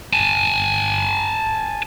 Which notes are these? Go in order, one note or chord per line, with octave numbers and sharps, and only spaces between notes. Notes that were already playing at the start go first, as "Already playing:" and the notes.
G#5 A5